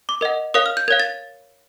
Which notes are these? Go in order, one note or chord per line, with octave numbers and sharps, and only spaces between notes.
D6
A#4 D#5 F#5
A#4 C#5 F5 D#6
F6
G6
A#4 C#5 F5 G#6
A6